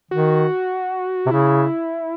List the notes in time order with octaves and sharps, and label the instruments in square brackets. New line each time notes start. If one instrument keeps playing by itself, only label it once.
[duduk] D#3 [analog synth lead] F#4
[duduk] C3
[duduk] C#3 [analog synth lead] E4